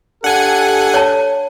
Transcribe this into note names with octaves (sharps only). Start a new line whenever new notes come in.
D4 G4 A4 F#5 G#5
C#5 A5